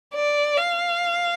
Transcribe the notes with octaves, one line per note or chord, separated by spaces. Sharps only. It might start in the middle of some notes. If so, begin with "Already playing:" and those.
D5
F5